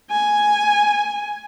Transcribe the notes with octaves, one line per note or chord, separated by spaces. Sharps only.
G#5